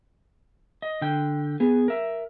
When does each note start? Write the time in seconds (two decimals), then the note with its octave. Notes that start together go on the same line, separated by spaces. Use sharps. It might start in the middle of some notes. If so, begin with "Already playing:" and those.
0.82 D#5
1.01 D3 G5
1.60 B3 G#4
1.88 A#4 E5